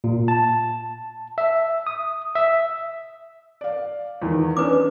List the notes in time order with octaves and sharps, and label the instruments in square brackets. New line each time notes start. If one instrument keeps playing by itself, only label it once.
[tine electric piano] A#2
A5
E5
D#6
E5
[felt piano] D5 F5
E2 D#3
[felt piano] C#4 D4 [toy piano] B4 D6